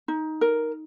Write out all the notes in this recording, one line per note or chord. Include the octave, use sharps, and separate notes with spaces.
D#4
A#4